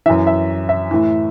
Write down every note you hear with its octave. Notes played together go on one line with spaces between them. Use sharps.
F#2 E3 E5
E5
E5
A2 E3